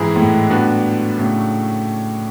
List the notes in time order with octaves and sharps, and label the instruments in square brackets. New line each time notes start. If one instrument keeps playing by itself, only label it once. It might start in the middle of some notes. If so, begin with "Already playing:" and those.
Already playing: [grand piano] G#2 [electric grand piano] E3 G#3 C4 E4 G#4
[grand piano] A2
[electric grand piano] G3 B3 D4 F#4 B4
[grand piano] A2 [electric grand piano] C#3 F#3 A3 D4